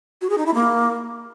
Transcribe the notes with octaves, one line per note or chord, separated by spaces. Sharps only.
F#4
G#4
D#4
E4
A#3